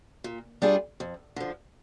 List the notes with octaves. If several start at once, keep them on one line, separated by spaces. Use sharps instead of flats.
A#2
G3 D4 F4 G#4
F2
D3 F3